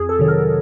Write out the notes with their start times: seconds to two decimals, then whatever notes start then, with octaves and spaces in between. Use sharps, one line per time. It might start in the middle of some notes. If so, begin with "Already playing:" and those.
Already playing: F2 G#4
0.09 A4
0.19 C3 D#3 F#3
0.28 A#4